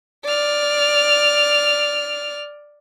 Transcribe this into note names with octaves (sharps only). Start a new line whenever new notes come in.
D5 F6